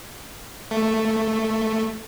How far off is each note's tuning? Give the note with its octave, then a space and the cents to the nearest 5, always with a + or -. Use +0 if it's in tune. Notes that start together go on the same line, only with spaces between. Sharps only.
A3 +5